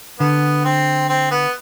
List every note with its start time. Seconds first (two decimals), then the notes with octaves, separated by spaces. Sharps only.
0.19 D3 B3
0.65 C4
1.09 C4
1.31 B3